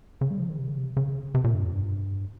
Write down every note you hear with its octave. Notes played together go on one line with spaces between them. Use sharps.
C#3
G3
F3
D#3
C3
C#3
C3
C#3
C3
A#2
G2
F2
G2